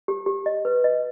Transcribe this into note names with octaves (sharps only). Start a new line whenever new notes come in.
G4
G4
D#5
B4
D#5